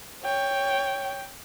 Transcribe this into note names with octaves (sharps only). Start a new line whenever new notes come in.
C#5 G5